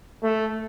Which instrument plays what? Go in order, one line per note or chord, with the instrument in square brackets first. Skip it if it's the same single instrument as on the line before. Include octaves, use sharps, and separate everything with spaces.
[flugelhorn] A3